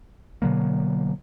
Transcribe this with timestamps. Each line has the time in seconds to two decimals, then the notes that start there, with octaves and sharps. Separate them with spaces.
0.42 B2 D3 F#3 A#3